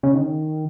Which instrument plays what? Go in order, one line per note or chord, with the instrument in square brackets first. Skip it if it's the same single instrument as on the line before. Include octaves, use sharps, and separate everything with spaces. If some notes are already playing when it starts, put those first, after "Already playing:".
[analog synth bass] C#3
D#3